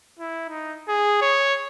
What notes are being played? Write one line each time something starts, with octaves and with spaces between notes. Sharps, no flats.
E4
D#4
G#4
C#5